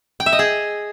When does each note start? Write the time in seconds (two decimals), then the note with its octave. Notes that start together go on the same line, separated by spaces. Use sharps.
0.20 G5
0.26 E5
0.33 D#5
0.39 G#4